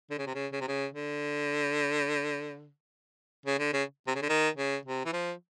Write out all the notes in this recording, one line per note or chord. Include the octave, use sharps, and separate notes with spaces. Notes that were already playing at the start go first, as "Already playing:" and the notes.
D3
C#3
C3
C#3
C#3
C3
C#3
D3
C#3
D3
C#3
C3
C#3
D3
D#3
C#3
C3
E3
F3